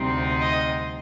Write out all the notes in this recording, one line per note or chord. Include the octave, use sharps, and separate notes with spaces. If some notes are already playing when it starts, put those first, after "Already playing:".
Already playing: D2 C3 G3 C4 D#4
D#5